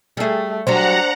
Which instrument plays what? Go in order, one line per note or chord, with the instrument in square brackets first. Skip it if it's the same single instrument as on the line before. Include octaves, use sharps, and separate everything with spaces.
[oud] G3 G#4 [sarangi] A3
[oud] F#3 G3 F#4 [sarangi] D4 [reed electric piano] C5 [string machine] F#5 A#5